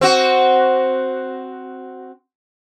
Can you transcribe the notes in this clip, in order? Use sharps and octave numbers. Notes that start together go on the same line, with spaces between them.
C4 F#4